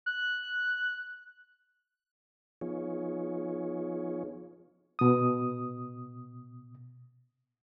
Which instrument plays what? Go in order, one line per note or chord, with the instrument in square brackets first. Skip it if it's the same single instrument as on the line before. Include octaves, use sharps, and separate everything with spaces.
[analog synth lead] F#6
[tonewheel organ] F3 B3 D#4 F4 G#4 C#5
[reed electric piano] B2 D#6